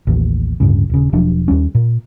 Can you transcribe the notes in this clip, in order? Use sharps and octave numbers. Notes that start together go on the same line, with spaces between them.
A1 D#2
D1 G2 C#3
D#1 C#3
E1 F3 F#3 D4
D#2 G3 C#4
A#2